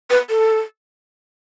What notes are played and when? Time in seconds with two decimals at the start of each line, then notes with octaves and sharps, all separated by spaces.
0.10 B4
0.30 A4